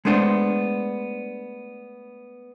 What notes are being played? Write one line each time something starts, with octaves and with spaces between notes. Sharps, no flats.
G#3 A3 B3 D4 C5